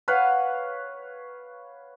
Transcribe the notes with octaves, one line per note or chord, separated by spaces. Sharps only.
B4 C#5 F5 F#5